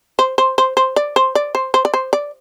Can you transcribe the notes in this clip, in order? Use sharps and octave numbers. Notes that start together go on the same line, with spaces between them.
C5
C5
C5
C5
D5
C5
D5
C5
C5
D5
C5
D5